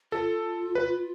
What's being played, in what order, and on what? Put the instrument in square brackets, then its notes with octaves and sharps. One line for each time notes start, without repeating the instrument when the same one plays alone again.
[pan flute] F4 [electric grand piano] A4
[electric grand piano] B4